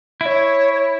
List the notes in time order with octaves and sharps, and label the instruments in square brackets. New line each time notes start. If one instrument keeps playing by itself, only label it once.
[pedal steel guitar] E4 [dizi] E5
[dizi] C#5
C#5